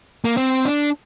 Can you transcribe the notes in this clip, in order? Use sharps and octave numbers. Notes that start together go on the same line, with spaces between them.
A#3
C4
D4